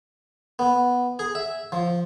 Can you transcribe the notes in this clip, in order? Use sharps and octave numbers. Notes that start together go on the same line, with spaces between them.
B3
G#4
E5
F3